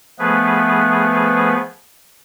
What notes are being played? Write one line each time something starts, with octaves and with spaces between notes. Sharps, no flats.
F3 A3 B3 G#4 B4